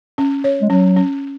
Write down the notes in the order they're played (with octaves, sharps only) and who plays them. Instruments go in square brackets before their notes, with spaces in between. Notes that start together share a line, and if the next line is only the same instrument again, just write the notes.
[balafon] C#4
C#5
[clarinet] G#3
[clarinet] F#3 [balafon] C#4
[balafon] C#4